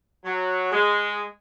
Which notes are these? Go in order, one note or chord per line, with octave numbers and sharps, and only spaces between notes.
F#3
G#3